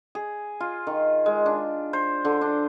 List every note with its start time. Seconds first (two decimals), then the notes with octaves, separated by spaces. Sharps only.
0.15 G#4
0.60 F4
0.87 D#3
1.26 G#3
1.46 D4
1.93 C5
2.25 D3
2.41 D4